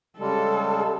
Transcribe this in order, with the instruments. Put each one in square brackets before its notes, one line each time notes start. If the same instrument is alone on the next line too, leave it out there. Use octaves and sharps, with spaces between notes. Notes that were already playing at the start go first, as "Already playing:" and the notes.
[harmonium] C#3 G3 G#3 [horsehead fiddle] A4